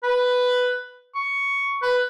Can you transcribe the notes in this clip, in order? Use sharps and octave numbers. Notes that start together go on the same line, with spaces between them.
B4
C#6
B4